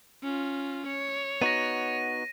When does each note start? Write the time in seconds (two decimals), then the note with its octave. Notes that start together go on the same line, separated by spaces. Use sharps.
0.23 C#4 F4
0.86 C#5
1.42 B3 D#4 F#4 A#6 D#7